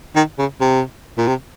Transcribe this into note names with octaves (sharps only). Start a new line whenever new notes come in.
D#3
C#3
C3
A#2
C3